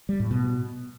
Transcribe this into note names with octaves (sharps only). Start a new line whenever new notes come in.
G3
A2
B2